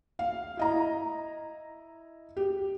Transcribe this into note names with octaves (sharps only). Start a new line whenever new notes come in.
F5
E4 D#5 A#5
G4